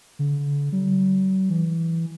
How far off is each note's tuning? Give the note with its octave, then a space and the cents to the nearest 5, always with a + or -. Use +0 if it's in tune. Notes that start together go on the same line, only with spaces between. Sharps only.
D3 -40
F#3 +45
E3 +0